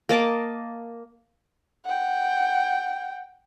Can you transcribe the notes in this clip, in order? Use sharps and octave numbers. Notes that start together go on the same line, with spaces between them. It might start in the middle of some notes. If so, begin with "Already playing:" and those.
A#3 D#5 A5 D6
F#5 G5